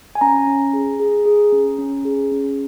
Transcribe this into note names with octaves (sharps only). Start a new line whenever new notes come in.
G#5
C#4 A#5
C#4
G#4
G#4
G#4
C#4
C#4
G#4
C#4